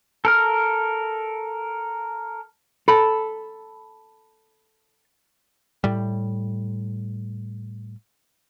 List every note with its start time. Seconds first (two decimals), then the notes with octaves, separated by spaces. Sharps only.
0.25 A4 A#4 F6
2.88 A4 B5
5.84 A2 G3